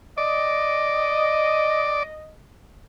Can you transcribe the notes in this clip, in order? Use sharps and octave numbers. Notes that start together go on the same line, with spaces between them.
D5 D#5